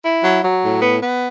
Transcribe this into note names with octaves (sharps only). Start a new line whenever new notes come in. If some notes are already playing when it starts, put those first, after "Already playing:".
E4
F#3
F#3
A2
B3
B3